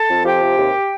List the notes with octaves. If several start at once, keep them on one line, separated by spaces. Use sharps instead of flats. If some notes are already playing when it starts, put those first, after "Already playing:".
Already playing: A4 A5
F2
F3 G4 G5
C3
D#2